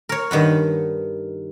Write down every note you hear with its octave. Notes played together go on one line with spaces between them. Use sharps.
A#4 C#5
G2 D#3 B4 F#5